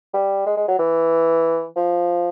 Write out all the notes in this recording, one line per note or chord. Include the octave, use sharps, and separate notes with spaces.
G3
G#3
G#3
F#3
E3
F3